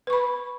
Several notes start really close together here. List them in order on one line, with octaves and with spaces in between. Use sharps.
B4 C#6 B5